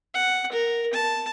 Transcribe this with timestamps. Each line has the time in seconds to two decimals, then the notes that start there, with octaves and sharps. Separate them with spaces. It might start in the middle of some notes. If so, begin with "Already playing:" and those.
0.14 F#5
0.52 A#4
0.93 A5